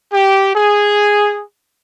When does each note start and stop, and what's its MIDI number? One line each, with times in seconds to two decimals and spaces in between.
0.13 0.55 67
0.56 1.43 68